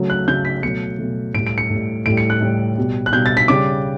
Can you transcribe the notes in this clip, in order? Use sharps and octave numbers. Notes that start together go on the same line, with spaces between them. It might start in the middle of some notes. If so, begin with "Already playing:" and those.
Already playing: C#3 F#3 A3
F#6
C#3 F#3 A3 G6
B6
B2 F#3 A3 C#7
B2 F#3 A3
A2 G3 D7
D7
C#7
A2 G3
A2 G3 D7
C#7
F#6
A2 G3
B2 G3
F#6
B2 G3 G6
A6
B6
C#3 G3 D6